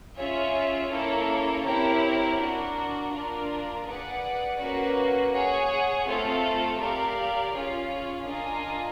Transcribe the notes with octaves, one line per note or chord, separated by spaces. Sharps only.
C#4 F4 G#4 C#5 E5
A#3 C#4 E4 A4 C#5
C4 E4 G4 A#4 C#5
D4 F#4 A#4
A#3 D4 F4 A#4 D5
G#4 B4 D5 F#5
A#3 C#4 F#4 B4
G#4 C#5 F#5
A3 C4 F4 A4
G4 A#4 D5 F5
C#4 F4 G#4 C#5 F5
D4 F4 A#4 D#5 G#5